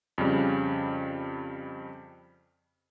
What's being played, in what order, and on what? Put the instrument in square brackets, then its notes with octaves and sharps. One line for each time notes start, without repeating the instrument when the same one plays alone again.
[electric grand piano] F2 C#3 G3